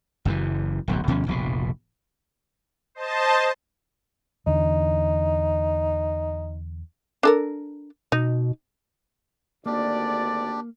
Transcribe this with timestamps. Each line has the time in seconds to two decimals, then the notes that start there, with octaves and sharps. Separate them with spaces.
0.25 F#1 F#2 D3 E3
0.88 D1 B1 F#2
1.08 D2 B2 F3 C#4
1.27 F1 A#1 B2
2.95 C5 D#5 A5
4.47 E2 D3 D#4
7.23 D4 A4 A#4
8.12 B2 D#4
9.66 G#1 D2 A#3 D4 G4 D5